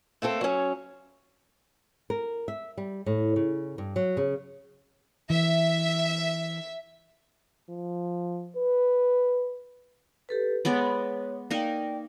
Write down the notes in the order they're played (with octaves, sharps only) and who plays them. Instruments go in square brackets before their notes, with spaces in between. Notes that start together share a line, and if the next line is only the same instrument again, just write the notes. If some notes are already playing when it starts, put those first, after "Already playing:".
[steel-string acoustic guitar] A3 A#3 C4 A4
F#3 C#4
[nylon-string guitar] A#4
E5
G3
A2
C#3
G2
F#3
C#3
[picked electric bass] E3 [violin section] E5
[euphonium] F3
B4
[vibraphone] G4 A4 B4
[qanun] G#3 B3 D5 [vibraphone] C#5
[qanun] A#3 D#4 A#4 [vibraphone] D5 G5